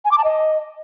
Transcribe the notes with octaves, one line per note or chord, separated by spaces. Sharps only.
G#5
D6
A5
D#5